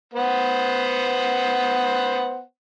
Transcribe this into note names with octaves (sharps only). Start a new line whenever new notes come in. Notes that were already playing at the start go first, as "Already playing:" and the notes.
B3 C5 F#5